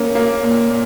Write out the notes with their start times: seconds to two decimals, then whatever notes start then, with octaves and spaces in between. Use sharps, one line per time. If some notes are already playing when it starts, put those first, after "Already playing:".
Already playing: A#3 C#4
0.15 A#3
0.43 A#2
0.70 A#2